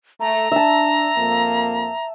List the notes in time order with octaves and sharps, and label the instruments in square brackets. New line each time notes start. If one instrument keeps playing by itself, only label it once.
[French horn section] A3 [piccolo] A#5
[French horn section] D4 [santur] E5 A5
[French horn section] F2 A#3